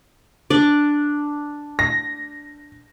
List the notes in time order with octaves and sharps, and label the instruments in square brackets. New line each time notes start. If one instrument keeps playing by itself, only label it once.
[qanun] D4 D5
[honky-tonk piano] A#6